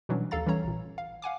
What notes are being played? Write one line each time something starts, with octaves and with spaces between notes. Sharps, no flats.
B2 E3 F#3 G3 C#4 D4
A#1 D#2 A4 F5 A#5 A6
E3 G3 C#4 C#5 A#5
A1 A#2
F5
F5 F#5 G#5 D6